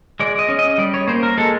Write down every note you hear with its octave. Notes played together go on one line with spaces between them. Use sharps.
G#3 D5
D#5
C#4
D#5
G3 D5
C#5
A#3 C5
A#4
G#3 A4